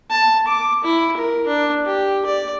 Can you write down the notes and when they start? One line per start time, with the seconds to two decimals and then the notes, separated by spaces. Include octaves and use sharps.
0.11 A5
0.48 D6
0.84 E4
1.17 A#4
1.47 D4
1.86 G4
2.26 D5